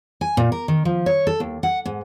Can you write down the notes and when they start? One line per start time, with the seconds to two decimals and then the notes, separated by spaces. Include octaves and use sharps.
0.21 G#5
0.37 A#2
0.52 A#4
0.68 D#3
0.85 F3
1.06 C#5
1.27 A4
1.40 D#2
1.63 F#5
1.85 G#2